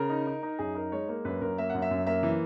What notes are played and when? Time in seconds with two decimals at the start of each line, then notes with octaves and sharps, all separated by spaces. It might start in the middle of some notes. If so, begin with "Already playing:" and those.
Already playing: C#3 A#4
0.10 D#4
0.27 D#4
0.43 D#4
0.59 F#2 G#4
0.75 D#4 A#4
0.92 G#3 C#5
1.08 A#3
1.25 F#2 B4
1.41 F#2 A#4
1.58 A#3 E5
1.70 F#2 F#5
1.82 E5
1.91 F#2
2.06 A#3 E5
2.23 E3